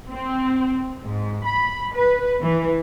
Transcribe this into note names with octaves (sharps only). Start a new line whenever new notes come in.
C4
G#2
B5
B4
E3